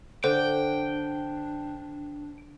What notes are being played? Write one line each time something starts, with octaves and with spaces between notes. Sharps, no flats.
D3 D4 C5 G5